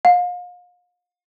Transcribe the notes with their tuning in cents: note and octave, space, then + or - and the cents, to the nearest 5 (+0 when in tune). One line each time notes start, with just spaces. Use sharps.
F5 +35